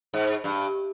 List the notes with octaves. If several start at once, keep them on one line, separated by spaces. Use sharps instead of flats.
G#2
G2